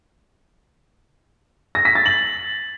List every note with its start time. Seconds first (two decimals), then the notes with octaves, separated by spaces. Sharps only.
1.75 A#6
1.85 B6
1.95 A6
2.06 F#7